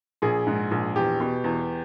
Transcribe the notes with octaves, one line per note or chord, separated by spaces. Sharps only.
A#1 G#4
G#2
A#1
E2 G4
B2
E2